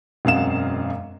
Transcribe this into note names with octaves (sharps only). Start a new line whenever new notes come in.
E1 F#2 C4 F5 F#5 E7